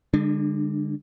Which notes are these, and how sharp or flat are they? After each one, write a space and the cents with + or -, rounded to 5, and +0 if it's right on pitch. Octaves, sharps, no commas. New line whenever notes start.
D3 +0 G#3 -40 D4 +35